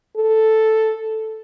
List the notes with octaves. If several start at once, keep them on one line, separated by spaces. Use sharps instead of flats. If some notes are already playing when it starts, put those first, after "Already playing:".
A4